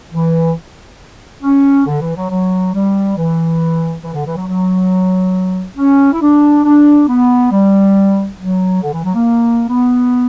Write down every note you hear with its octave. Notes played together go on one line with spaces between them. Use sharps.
E3
C#4
D3
E3
F#3
F#3
G3
E3
E3
D3
E3
F#3
F#3
C#4
E4
D4
D4
B3
G3
F#3
D3
E3
F#3
A#3
B3